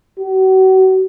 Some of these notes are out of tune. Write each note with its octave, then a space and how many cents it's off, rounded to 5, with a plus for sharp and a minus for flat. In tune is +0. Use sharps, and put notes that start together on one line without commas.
F#4 +35